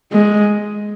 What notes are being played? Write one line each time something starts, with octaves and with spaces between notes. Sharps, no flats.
G#3